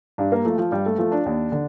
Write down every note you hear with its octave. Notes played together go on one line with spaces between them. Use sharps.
G2 D4
A#3
F3 A3
F3
G2 G3
A3
F3 A3
D4
D#2
D3